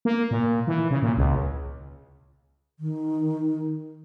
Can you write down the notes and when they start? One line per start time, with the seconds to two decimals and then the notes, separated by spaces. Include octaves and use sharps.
0.05 A#3
0.31 A#2
0.67 E3
0.91 C#3
1.02 A#2
1.17 C#2
2.79 D#3